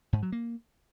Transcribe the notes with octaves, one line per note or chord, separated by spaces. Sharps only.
G#2
F#3
A#3